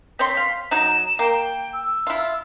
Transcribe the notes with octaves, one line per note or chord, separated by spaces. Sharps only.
C4 C#5 C6 B6
F5
F#3 D#4 E7
A#3 G5
E6
E4 F4